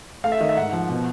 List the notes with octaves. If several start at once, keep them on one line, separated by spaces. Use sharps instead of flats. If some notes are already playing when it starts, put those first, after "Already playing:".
A3 F5
E5
D#3 D#5
E5
G#2 F#5
F3
B2